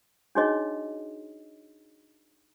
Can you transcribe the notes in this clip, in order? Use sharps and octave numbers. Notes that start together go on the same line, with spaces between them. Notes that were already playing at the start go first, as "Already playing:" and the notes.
D4 D#4 F#4 G#4 C#5 D#5